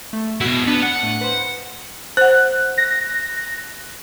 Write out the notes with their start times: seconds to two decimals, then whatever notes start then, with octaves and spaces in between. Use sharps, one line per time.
0.13 A3
0.41 B2 E4 F#4 C7
0.67 B3 D4
0.83 F#5
1.03 A2
1.21 B4 C5
2.17 C5 F#5 F#6
2.78 A#6